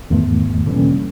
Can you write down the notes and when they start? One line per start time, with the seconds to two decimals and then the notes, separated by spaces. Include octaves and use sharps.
0.10 E2 G#2 D#3 A3
0.66 B2 D3 E3 G3 A#3 C#4